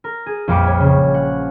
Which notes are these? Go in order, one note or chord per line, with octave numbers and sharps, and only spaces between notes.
A#4
G#4
A#1 F2 G3 B4 D6 C#7
C#5
C#3 G3
F#5